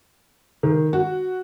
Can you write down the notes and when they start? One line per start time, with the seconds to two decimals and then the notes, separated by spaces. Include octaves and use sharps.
0.63 D#3
0.93 F#4